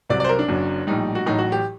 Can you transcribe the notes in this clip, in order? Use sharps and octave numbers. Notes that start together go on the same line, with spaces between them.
C2 C3 F#3 D5
D5
C5
A#4
D4
F#1 F#2 F#3
A#1 A2 G3 D#4
F#4
A1 A2 F#3 D#4
F#4
G4